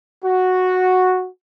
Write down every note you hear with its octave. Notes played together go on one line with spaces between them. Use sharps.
F#4